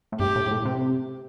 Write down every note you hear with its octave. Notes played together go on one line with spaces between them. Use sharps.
A2
G2 G4
A2
A2
C3